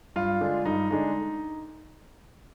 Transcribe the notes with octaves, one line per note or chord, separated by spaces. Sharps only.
G2 F4
D3 G#3 D4
G2 D#4
D3 G#3 D4 D#4